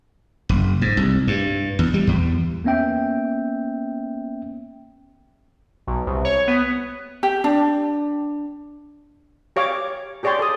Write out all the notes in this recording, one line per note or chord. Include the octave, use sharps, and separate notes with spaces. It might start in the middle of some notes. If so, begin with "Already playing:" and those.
F#1
G#2
C2
G2
E2
G3
E2
A#3 B3 C#4 E5 G5
B1
C2
C#5
B3
G4
D4
G4 C#5 F5 D6
G4 G#4 C#5 D5 G5 C6
A4 D#6